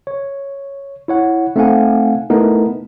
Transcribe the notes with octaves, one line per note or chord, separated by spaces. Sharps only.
C#5
E4 C#5 F#5
A3 C4 D#4 F5 F#5 G#5
A3 B3 D#4 E4 A#4